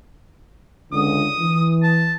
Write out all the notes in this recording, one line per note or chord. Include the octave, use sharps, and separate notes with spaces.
C#2 D3 D#6
E3
A5